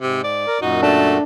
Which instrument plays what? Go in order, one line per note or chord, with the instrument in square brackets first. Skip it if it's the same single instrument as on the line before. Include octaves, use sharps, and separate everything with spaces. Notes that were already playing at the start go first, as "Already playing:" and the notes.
[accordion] G#2 [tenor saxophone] C3
[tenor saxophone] D5
[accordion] A#4
[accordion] F#2 A#2 F#4 [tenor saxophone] D#4
[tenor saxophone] A3 [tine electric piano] D4